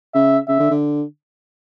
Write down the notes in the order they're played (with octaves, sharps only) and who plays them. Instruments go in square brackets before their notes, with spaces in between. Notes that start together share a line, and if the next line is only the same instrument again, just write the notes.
[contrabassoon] C#3 [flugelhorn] E5
[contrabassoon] C#3 [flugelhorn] E5
[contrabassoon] D3
D3